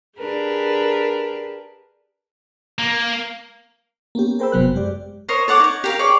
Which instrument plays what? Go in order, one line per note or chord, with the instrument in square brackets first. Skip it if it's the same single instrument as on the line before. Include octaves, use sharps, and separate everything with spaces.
[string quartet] D4 G4 G#4 A#4 B4
[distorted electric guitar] A#3
[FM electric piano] A#3 B3 C#4 G4
G#4 A#4 C5 G5 B5 E6
G1 C3 F#3 B3 C5 F#6
F#2 G#3 G4 D5
[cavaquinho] A#4 C5 C#5 D#5
A4 C#5 F#5 D6
D#4 C#5
G4 A#4 F5
G#4 C#5 D5 G5